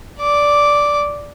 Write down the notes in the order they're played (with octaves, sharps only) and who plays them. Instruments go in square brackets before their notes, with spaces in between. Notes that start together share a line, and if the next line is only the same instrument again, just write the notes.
[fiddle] D5 D6